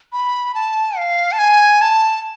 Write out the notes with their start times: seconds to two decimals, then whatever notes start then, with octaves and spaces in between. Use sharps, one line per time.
0.13 B5
0.55 A5
0.97 F5
1.32 A5
1.39 G#5
1.82 A5